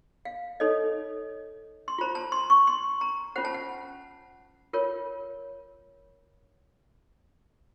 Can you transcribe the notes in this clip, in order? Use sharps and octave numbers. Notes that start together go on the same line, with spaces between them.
F5
D#4 A4 C#5 D#5
C6
F4 C5 A#5
A5
C6
C#6
C6
A#5
C#4 F4 C5 F#5
A5
F#5
F4 A#4 C#5